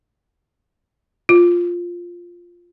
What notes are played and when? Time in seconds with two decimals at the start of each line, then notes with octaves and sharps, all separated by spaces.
1.29 F4